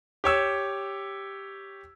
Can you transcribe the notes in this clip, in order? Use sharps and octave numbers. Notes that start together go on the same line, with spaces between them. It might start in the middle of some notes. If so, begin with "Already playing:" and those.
G4 C#5 E6